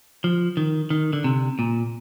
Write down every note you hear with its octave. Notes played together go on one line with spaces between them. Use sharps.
F3
D#3
D#3
D3
C3
A#2